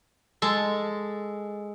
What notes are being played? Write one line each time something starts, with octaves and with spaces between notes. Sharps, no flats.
G#3 A4